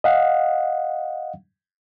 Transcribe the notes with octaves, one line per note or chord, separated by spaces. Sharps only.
D#5 F5 F#5